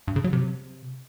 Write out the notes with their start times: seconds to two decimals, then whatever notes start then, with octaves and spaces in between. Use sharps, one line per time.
0.08 G2
0.16 C#3
0.24 F#3
0.33 C3